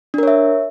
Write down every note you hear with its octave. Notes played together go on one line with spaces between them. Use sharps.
D4 A#4 C#5 E5